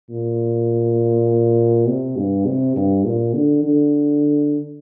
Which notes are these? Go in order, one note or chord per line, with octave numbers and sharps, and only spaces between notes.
A#2
C3
G2
C3
G2
A#2
D3
D3